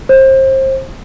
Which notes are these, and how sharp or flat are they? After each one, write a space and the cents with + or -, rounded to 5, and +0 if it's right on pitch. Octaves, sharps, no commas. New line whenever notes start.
C5 +30